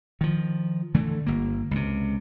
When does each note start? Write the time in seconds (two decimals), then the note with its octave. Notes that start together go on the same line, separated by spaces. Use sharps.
0.21 D#3 F3
0.94 D3 E3 A3
1.26 G1 A#3
1.71 C#2 C3